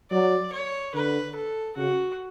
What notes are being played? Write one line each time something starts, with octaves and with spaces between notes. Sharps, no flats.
F#3 D5
C#5
D3 B4
A4
C#3 F#4